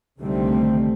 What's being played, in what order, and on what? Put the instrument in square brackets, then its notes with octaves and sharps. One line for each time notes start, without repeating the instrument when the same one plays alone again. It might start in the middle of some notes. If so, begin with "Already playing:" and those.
[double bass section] C2 D3 D#3 G3 A3 C4